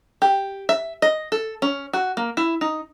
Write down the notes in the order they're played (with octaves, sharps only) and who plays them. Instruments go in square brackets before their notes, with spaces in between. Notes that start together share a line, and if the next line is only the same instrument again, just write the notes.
[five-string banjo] G4
E5
D#5
A4
C#4
F#4
A#3
E4
D#4